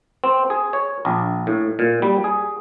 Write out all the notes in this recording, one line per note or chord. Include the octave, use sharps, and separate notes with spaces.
C4
G#4
C#5
A#1
A2
A#2
G3
G#4